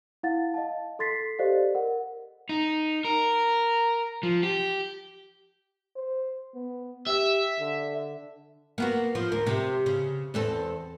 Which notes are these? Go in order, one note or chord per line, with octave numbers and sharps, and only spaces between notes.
E4 F5 F#5 A6
D#5 F5 A5
A4 C6 A6 B6 C7
G4 A4 C5 D5 D#5 F5
A#4 F#5
D#4
A#4
F3
G4
C5
B3
G4 E5
D3
A#3 B3 F#4
F3
D2 A#4
C3
C#3
E2 C4 A4